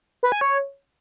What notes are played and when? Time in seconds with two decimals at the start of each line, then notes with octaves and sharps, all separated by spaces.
0.23 B4
0.32 G#5
0.41 C#5